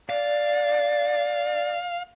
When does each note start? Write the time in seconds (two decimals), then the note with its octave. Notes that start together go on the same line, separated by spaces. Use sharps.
0.09 D5 F5